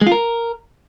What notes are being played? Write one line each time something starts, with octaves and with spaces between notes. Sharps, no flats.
G#3
F4
A#4